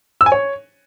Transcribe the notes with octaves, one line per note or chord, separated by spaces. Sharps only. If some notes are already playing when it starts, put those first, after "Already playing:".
E6
G#5
C#5